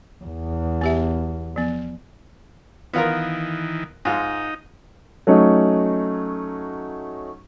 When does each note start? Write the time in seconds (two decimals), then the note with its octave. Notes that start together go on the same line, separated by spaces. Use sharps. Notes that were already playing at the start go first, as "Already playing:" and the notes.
0.24 E2
0.81 B3 G4 E5
1.56 F3 B3
2.94 D#3 E3 B3 F4 A#4
4.05 G#2 D#4 F4
5.27 F#3 A3 C#4 D#4